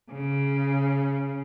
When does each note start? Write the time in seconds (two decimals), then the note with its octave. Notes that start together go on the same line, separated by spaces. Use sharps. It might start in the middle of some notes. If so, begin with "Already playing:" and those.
0.11 C#3